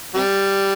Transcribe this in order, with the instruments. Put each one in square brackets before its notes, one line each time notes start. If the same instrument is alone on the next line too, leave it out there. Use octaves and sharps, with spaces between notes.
[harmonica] C3 G3